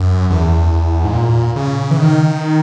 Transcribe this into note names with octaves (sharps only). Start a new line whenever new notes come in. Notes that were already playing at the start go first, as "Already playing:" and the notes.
Already playing: F#2
E2
G#2
A#2
C#3
E3
D#3